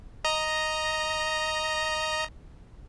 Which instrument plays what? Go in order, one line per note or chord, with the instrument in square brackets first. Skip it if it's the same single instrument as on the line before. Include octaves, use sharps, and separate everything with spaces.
[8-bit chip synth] D#5 A#5